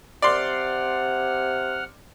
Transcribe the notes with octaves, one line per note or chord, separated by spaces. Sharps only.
C3 D5 F#5 C6 F6